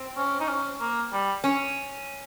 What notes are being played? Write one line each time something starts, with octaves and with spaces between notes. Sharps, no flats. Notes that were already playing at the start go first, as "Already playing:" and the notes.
Already playing: C4
C#4
D#4
C#4
A#3
G3
C#4